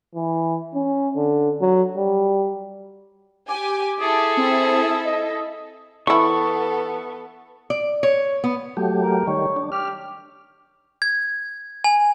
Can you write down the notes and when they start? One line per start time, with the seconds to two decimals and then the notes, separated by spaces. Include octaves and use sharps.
0.15 E3
0.74 C#4
1.16 D3
1.61 F#3
1.97 G3
3.48 G4 G#5 D6
4.00 E4 G#4 A4 E5
4.37 C4
5.05 D#5
6.07 E3 B3 E4 A4 C#6
7.70 D5
8.03 C#5
8.44 B3
8.77 F#3 A3 G4
9.02 A#4
9.27 D#3 G3 C#5
9.56 D4
9.72 G4 F6
11.02 G#6
11.84 G#5